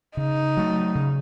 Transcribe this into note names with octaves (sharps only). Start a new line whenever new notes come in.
C#3 D#4
F#3 A3
C#3